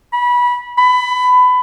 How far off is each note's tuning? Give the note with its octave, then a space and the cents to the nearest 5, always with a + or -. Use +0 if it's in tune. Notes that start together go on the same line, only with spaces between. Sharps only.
B5 -20
B5 +20